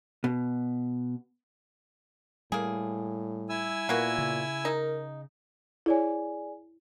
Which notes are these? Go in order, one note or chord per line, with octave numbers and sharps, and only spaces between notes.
B2
A2 G3 A#3 G#4
E4 G#5 E6
A#2 A#3 B3 F#4
C#3
D#4 A#4
E4 G#4 C#5 D5 G#5